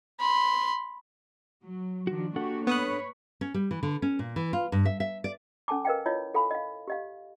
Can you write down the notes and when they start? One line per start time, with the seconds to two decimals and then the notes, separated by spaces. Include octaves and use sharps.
0.19 B5 C6
1.63 F#3
2.07 D#3 F3 D4 F#4
2.36 A#3 D4 F#4 G4 A4 F#5
2.67 B3 B4 C#5 D#6 F#6
3.41 C#4
3.54 G3
3.71 E3
3.83 D3
4.02 C#4
4.19 A#2
4.36 E3
4.53 F4
4.72 G2
4.85 E5
5.00 E5
5.24 D5
5.68 C#4 A4 G#5 A5 D6
5.85 A#4 B4 D#5 F5 G5
6.06 E4 F4 C#5 D#5
6.34 A4 F5 G#5 B5
6.51 D#5 F5
6.88 G4 D#5 F5